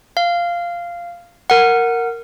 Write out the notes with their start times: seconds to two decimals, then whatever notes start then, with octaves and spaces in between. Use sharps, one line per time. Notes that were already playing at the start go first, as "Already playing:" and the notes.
0.17 F5
1.50 A#4 F#5